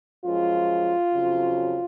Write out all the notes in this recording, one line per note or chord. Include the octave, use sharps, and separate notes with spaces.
F#2 F3 G#3 F4
F2 C#3 F#3